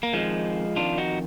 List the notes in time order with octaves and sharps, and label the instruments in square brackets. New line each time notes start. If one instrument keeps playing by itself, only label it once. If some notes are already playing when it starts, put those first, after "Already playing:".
[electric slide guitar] A#3
F2 D#3 F3 G#3
F2 D#3 D4 F4
D#4 F#4